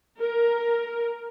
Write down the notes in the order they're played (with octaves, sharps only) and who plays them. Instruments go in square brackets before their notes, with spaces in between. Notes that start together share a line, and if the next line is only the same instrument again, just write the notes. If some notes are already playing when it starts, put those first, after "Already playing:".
[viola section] A#4